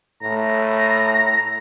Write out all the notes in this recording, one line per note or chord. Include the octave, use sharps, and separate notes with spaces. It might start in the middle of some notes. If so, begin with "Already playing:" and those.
A2 A#5